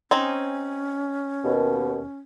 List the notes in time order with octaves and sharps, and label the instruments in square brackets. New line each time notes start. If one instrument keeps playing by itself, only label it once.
[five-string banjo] C4 D#4 G#4 [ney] C#4
[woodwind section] D#2 B2